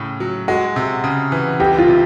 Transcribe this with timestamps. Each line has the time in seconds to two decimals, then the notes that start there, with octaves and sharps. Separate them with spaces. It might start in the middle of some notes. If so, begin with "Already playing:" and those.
Already playing: A2 C#3
0.20 F#3
0.48 G#3 F#4
0.76 C3
1.04 C#3
1.32 E3
1.60 C#2 G4
1.79 F4
1.88 C3